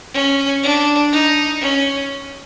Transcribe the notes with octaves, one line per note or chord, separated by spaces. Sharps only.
C#4
D4
D#4
C#4